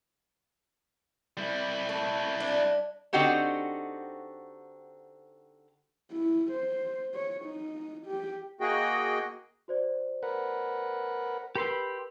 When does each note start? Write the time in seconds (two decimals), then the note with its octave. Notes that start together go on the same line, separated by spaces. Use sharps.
1.37 G3 E4
1.89 A3
2.40 D4
3.13 D3 C4 D#4 F#4 G4 C5
6.11 E4
6.52 C5
7.14 C#5
7.45 D#4
8.06 G4
8.61 A#3 F#4 G#4 D#5 G5
9.68 F#4 C5 D5
10.23 A#4 B4 F#5
11.56 G4 A#4 B4 B5 C6 E6